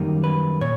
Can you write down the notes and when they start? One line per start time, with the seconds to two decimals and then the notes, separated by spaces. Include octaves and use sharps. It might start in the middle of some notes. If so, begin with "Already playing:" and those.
Already playing: F#2 D#3 G3 A#3 D#4
0.24 B4
0.61 A#2 C#5